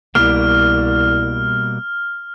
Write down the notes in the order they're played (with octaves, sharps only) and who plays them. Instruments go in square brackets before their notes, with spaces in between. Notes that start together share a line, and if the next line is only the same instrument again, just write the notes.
[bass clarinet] C2 [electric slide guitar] B2 G3 A#3 [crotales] F6